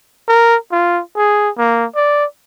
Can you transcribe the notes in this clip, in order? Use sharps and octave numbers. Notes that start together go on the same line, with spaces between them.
A#4
F4
G#4
A#3
D5